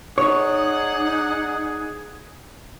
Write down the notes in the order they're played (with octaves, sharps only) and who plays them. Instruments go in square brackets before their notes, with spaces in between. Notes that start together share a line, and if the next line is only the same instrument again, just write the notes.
[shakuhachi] D#4 [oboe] G#4 [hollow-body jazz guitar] C#5 [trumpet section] D5 F#5